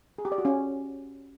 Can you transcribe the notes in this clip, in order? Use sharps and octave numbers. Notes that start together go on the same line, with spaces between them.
G#4
G4
D5
F#4
C#4